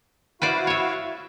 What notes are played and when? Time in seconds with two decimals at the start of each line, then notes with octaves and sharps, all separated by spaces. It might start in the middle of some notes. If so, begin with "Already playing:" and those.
0.42 E4 F#4 B4 C5 D5 F5
0.67 C#5 E5